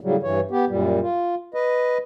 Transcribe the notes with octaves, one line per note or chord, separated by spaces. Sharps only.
A2 C#3 F#3 G3
G2 E3 C#5
B3 G4
F#2 A#2 G3
F4
B4 D#5